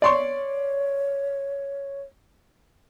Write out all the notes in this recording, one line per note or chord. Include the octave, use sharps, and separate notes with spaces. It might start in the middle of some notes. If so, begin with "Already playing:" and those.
C#5 D5 C6 C#6